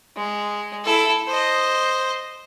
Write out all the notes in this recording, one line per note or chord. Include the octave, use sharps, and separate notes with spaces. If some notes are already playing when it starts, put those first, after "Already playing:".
G#3
E4 A4
C5 D#5